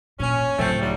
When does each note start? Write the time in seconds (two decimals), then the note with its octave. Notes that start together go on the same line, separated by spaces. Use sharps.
0.20 A#2 C#4
0.59 D1 C#2 A3 C4
0.81 G#2 F#3 G3